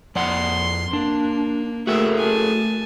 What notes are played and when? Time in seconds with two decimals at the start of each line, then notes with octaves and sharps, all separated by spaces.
0.15 F2 D5 F#5 C6
0.93 A#3 D4
1.87 A3 F#4 G#4 A#4 E5
2.18 G#5 A5